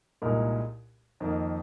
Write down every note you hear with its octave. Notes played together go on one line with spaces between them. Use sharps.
C2 A#2 G#3 D#4 A#4
F2 D#3 A#3 D#4